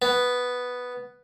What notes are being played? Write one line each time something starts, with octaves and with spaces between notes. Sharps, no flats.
B3